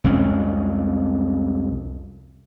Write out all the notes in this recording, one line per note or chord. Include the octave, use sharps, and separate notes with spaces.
C2 F2 G#3 C#4